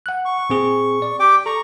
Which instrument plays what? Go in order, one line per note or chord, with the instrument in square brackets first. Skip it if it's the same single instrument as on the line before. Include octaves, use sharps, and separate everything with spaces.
[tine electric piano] F#5 F#6
[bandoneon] C#6
[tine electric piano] A#2 C4 G#4
D5
[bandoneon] G4 G5 D6
[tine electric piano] A4 [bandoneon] A#5 C#6